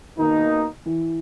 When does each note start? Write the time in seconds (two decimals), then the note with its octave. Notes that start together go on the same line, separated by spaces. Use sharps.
0.17 B2 D#3 A#3 D#4
0.86 E3